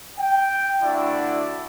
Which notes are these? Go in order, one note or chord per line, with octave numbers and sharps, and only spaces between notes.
G5
D2 D3 D4 E4 F#4 D5